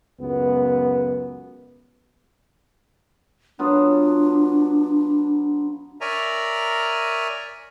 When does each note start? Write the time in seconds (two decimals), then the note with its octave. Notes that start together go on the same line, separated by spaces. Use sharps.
0.21 C#2 F#2 B3
3.59 F#3 B3 D4 F4
6.01 A#4 C#5 D5 E5 G#5 A#5